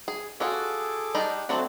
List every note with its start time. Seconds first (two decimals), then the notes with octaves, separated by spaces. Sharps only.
0.08 G#4
0.40 C#4 F4 F#4 G#4 A4 D6
1.15 G3 D4 D#4
1.49 F#3 A3 C4 D4 F#4